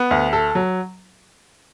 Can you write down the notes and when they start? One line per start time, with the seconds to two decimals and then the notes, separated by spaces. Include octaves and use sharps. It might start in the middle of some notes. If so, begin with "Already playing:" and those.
Already playing: B3
0.11 D2
0.33 A4
0.55 F#3